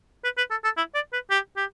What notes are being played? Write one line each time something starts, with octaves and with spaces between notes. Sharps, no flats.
B4
B4
A4
A4
E4
D5
B4
G4
G4